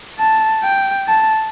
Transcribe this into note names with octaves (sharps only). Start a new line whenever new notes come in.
A5
G5
A5